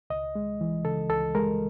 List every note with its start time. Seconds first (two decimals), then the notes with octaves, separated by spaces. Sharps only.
0.10 C#2 D#5
0.35 G#3
0.61 E3
0.85 C#3 A4
1.10 C#2 A4
1.35 G#3 A#4